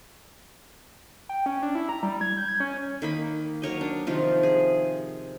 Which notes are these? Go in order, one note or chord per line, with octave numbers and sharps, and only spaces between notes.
G5
C#4
D4
E4
A#5
G3
G#6
G6
G#6
C#4
D#3 A#3 B5
F#3 A#4 C#5 D#5
D4
C3 D#3 F3 F4
G#4